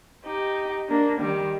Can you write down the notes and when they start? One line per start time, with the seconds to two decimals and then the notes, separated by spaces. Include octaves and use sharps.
0.25 D#4 G4
0.88 A#3 D4
1.21 D#3 G3